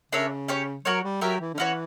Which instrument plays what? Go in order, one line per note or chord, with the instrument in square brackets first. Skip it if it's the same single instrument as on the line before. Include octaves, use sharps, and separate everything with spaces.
[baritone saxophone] C#3 [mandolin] D4 A#4 C#5 E5
[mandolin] C#4 G4 C#5
[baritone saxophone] F#3 [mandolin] F#4 A#4 C#5
[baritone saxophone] G3
[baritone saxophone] F#3 [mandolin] G4 A#4 E5
[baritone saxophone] E3
D3
[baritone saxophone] E3 [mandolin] C#4 F#4 C#5